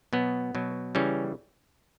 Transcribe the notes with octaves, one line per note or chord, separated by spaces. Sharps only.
B2 F#3 B3
B2 F#3
C#3 E3 G3 C#4